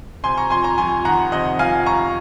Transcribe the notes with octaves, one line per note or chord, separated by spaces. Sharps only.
C3 G#5 C6
A#5 C#6
F2 G#5 C6
A#5 C#6
F2 G#5 C6
D#3 F#5 A#5
C3 D#5 F#5
F2 F5 G#5
F2 A#5 C#6